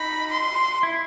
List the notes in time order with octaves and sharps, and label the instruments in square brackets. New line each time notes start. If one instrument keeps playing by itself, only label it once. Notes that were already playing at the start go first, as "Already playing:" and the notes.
Already playing: [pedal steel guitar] D#4 [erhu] B5
[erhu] C6
[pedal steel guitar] E4